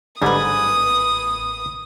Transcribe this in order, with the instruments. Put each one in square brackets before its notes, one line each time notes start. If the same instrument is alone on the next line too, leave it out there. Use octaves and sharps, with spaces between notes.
[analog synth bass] A1 [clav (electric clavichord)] G#2 D3 G3 [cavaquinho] B4 G#5 [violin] D#6